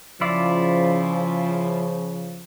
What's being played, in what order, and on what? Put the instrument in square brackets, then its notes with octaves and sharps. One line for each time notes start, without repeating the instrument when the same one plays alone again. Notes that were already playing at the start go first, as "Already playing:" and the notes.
[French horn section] C#3 F3 [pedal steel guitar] E4 F4 D5